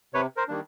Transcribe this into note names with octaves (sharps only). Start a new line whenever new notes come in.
C3 B4 C#5
A#4 C5
D#3 G3 A#3 D4